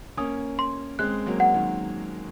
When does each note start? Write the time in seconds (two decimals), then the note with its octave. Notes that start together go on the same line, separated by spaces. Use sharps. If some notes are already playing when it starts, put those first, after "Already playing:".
0.17 A#3 C#4 D#6
0.59 C6
0.99 G#3 C4 F#6
1.26 F#3 A#3
1.40 F#5
1.54 D#3 F#3